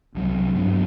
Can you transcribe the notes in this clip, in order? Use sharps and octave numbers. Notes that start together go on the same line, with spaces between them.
C2 C3 F#3
G2 F#3 B3 D4